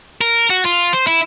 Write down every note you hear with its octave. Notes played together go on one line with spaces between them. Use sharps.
A#4
F#4
F4
C5
E4